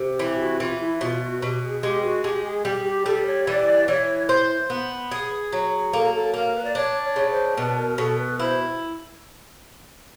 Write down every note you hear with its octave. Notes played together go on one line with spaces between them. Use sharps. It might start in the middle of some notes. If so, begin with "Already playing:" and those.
Already playing: C3
E3 G4
F#4
E3 F4
E4
B2 F4
F#4
B2 G4
G#4
G#3 G4
F#4
G#3 G4
G#4
G3 G4
G#4
G4
G3 A4
C#5
E3 D5
E3 C#5
C5
B3
G#4
F#3
A#3 A4
A4
A#3 A#4
B4
D5
D4 C#5
C#5
C#3
C5
B2 B4
A#4
B2 A4
B4
E4 C5